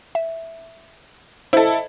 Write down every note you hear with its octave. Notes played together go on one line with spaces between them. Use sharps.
E5
E4 A4 C5 D#5